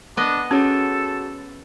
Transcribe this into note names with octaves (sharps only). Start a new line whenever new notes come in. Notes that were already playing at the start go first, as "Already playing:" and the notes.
B3 D4 D#5
C#4 F#4 G#4 A4 C#5